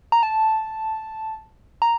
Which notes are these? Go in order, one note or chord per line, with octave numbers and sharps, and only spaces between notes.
A#5
A5
A#5